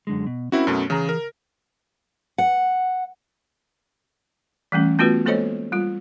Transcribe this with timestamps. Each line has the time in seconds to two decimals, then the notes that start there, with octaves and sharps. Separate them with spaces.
0.07 F#2 D3 G#3
0.26 B2
0.52 C4 C#4 E4 F#4 A#4 B5
0.67 F#2 B2 A3
0.90 C#3 E3 G#4 A#5
1.09 A#4
2.38 F#5
4.72 E3 G3 A3 C#4
4.99 A3 B3 F4 F#4 B4
5.26 G#3 A#3 A4 C5 C#5 D#5
5.72 G3 F4